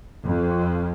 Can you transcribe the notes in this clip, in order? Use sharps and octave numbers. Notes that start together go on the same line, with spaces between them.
F2